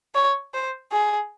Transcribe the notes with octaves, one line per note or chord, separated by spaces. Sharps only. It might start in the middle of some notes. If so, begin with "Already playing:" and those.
C#5
C5
G#4